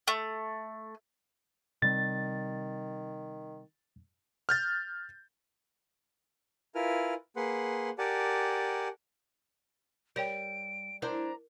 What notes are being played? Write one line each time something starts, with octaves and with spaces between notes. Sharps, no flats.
A3
C3 D#3 G3 C4 A6
F6 G6 A6
E4 F4 A#4 B4 G#5 F6
A#3 G#4 B4 F#5 C6
G4 A#4 D5 F#5 G#5 A5
G3 A#4 C#5 G5 D7
D4 E4 A#4 C5 A#5